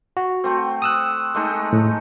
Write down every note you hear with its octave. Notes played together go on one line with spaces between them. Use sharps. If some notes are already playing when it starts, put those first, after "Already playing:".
F#4
A3 C4
D#6 E6 F#6
G#3 A3 D#4
A2